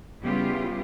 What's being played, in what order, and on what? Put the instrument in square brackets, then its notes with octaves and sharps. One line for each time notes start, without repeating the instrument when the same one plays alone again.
[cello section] C#3 G3 B3 E4 F4 G4